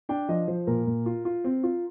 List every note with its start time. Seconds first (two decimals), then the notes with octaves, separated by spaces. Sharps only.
0.09 D4 G5
0.29 F3 D#5
0.48 F3 C5
0.67 A#2 A#4
0.87 A#2
1.06 F4
1.25 F4
1.44 C4
1.63 F4